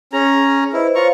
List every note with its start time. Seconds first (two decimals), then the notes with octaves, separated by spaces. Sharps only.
0.13 C#4 G#4 A#5
0.73 E4 B4 C5 D#5
0.95 F4 C5 C#5 F5 A#5 C#6